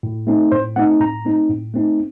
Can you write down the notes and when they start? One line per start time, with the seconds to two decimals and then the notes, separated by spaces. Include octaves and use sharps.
0.03 A2
0.27 A3 C4 D#4
0.52 A2 C5
0.76 A3 C4 D#4 F#5
1.01 A2 A#5
1.25 A3 C4 D#4
1.49 A2
1.74 A3 C4 D#4